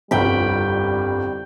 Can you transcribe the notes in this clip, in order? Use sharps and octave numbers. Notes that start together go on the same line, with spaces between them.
G1 C2 F2 G3 G5 B5